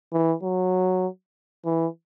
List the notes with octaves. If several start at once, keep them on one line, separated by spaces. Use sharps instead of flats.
E3
F#3
E3